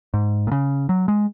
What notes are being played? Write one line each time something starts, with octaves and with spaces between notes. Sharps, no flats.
G#2
A#2
C#3
F#3
G#3